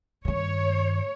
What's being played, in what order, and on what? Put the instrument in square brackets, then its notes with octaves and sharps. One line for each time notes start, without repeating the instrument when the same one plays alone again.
[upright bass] G2 D#3 [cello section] C#5